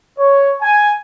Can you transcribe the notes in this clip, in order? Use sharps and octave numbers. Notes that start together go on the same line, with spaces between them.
C#5
G#5